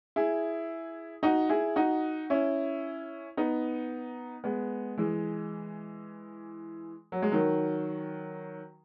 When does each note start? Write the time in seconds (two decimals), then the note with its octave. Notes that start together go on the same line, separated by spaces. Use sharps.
0.16 E4 G#4
1.23 D#4 F#4
1.49 E4 G#4
1.76 D#4 F#4
2.30 C#4 E4
3.37 B3 D#4
4.44 G#3 B3
4.98 E3 G#3
7.12 F#3
7.22 G#3
7.32 D#3 F#3